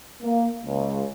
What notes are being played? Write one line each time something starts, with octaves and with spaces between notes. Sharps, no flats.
A#3
C#2